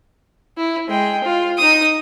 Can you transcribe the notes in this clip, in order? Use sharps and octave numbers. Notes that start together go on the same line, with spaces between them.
E4
G#3 G5
F4
D#4 D#6